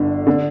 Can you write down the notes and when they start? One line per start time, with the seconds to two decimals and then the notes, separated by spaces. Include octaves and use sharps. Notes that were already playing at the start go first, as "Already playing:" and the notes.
Already playing: G1 D3
0.27 D3